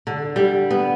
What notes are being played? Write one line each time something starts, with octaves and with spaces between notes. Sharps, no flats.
D3
G3
B3